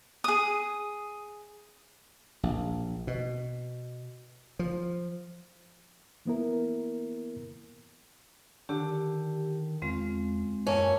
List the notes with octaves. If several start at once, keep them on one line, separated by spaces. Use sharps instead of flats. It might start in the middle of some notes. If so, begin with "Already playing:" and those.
G#4 D#6
A#1
B2
F3
E3 A#3 B3 E4 A#4
D3 D#3 G4
E2 G#3 C4 F4
F#2 E3 A3 A#3 C#4